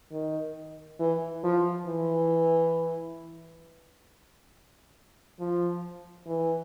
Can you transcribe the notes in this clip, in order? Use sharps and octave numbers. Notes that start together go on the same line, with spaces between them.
D#3
E3
F3
E3
F3
E3